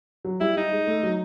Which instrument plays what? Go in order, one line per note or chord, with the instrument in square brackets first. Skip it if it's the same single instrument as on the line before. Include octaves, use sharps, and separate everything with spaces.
[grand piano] F#3
[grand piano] G3 [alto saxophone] E4
[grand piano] G3 [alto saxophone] D#4
[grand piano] G#3
A3
F#3